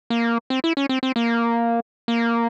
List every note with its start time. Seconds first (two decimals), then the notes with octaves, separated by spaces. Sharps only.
0.10 A#3
0.50 C4
0.64 E4
0.77 C#4
0.89 C4
1.03 C4
1.16 A#3
2.08 A#3